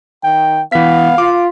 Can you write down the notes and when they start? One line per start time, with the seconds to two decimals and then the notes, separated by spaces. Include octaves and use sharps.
0.24 D#3 G5
0.72 E3 B3 F5 B6
1.18 F4 D6